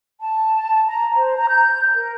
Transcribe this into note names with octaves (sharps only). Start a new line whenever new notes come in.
A5
A#5
C5
A#5
G6
A#4